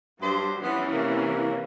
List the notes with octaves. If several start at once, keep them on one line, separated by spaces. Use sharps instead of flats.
G2 F#3 D4 C5
E3 B3 C#4
C3 A#3